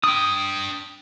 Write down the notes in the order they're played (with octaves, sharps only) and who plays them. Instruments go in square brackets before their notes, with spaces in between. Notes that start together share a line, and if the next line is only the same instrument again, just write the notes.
[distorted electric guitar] D4 G5 [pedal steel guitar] D#6